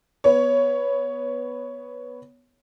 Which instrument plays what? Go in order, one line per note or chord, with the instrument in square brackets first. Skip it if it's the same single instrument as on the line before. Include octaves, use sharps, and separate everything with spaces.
[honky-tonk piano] B3 C#5